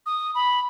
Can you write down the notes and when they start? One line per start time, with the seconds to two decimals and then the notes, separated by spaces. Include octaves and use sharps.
0.06 D#6
0.35 B5